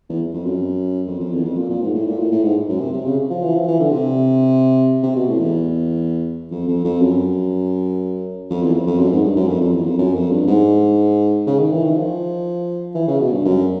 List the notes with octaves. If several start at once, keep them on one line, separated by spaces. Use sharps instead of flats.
E2
F2
F#2
F2
F2
E2
F2
A#2
A#2
G#2
A2
A#2
A2
A2
G#2
F#2
C3
C3
C#3
F3
E3
F3
E3
D3
C3
C3
B2
A2
E2
F2
F2
F2
F#2
F2
E2
F2
F2
F#2
G#2
G2
F#2
F2
F2
E2
F2
F#2
F2
G2
G#2
C#3
D#3
E3
D#3
F3
E3
C#3
B2
G2
F#2